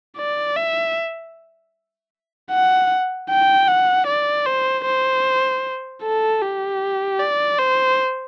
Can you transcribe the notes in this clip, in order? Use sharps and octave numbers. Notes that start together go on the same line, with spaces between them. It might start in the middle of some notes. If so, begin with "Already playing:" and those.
D5
E5
F#5
G5
F#5
D5
C5
C5
A4
G4
D5
C5